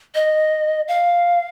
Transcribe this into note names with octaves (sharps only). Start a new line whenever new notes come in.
D#5
F5